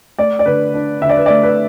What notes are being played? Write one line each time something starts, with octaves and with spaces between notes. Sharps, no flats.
A3 D5
D5
D3 B4
D4
D3 E5
D5
B4
A3 D5
B4